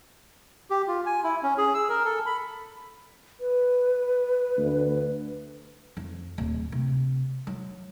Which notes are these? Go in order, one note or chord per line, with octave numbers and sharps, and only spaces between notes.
G4
F4
G#5
E4
C#4
G#4
E6
A#4
A4
B5
B4
D2
F2
D1
C3
F#3